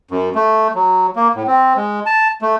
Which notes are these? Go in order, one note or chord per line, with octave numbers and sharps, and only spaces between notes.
F#2
A3
F#3
A#3
A2
C4
G#3
A5
A3